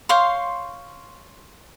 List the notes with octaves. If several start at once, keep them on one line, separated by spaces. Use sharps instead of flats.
C5 C#5 F5 C6